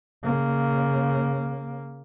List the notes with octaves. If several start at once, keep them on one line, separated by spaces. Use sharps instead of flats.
C#3 A#3